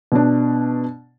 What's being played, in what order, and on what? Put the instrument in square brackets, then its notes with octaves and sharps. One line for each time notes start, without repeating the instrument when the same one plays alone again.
[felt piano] B2 D4